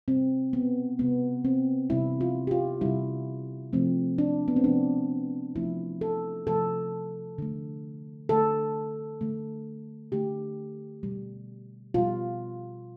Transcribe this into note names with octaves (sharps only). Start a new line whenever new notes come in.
C3 G3 C4
B3
C3 G3 B3
C4
C3 G3 E4
F4
G4
F4
C3 G3 E4
C3 F3 A3 C4
D4
B3
C4
C3 F3 A3 D4
C3 F3 A3 E4
A4
C3 F3 A3 A4
D3 A3
D3 A3 A4
D3 A3
D3 A3 G4
B2 G3
B2 G3 F4